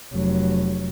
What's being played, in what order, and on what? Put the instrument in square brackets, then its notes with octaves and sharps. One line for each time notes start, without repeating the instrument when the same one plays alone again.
[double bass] F1 F#3